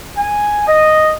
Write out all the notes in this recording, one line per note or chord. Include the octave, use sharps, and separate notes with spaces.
G#5
D#5